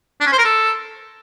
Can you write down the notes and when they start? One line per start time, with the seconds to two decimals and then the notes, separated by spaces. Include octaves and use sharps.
0.20 D4
0.26 C#4
0.32 C5
0.39 A#4
0.45 A4